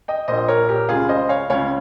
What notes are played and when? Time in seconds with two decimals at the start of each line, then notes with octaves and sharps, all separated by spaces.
0.08 D#5 G5
0.28 A#1 A#2 C5 D#5
0.48 A#4 C#5
0.69 G4 A#4
0.89 C#2 C#3 F4 G#4
1.09 C5 D#5
1.29 C#5 F5
1.50 C#2 C#3 C#5 F5